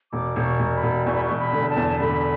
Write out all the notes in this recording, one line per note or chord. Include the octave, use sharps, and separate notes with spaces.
E1 D6
E1 D6
C#6
E1
B5
E1
E2 C#6
B5
C#6
E1
B5
D3
A5
E2
A5
D3 B5